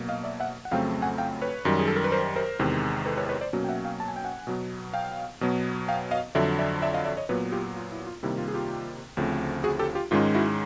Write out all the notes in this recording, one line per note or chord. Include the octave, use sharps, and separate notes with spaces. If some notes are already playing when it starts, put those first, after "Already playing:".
Already playing: B2 F#3 A#3
D#5 F5
D5 E5
E5 F#5
F#5
F2 C#3 F#3 A3 C4 F5 G5
F#5 G#5
F5 G5
B4 C#5
F#2 D#3 G3
G#4
A4
A#4
B4
A#4 C5
A#4 C5
E2 C3 D#3 G#3
A4 B4
B4 C#5
B4 C#5
C5 D5
B2 F#3 A#3 C#4
G5
E5 F#5
F5 G5
A5
G#5
G5
F#5 G#5
B2 F#3 B3
F5 G5
B2 F#3 B3
F5 G5
D#5 F5
F2 D3 F#3 D5 E5
D5 E5
D5 E5
D#5 F5
D5 E5
C#5 D#5
A#2 F#3 B3 B4 C#5
F4 G4
F4
E4
F4
C3 D#3 G3 A#3 E4
F4
G#4
F4 G4
D2 C#3 F3 A3 C4
F#4 G#4
G4 A4
F4 G4
G#2 D#3 G#3 C#4 F4
E4 F#4